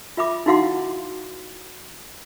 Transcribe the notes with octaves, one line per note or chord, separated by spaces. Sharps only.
F4 E5 B5 D6
D#4 E4 F#4 F5 F#5 C6